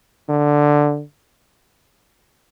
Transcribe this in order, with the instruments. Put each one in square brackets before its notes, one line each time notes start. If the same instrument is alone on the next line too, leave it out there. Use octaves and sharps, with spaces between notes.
[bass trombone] D3